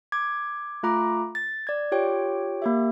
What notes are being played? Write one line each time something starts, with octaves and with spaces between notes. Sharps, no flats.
D6 G#6
A3 F4 A#5 B5 D6
A6
D5 G#6
F4 G4 C#5 G5
A#3 G4 E5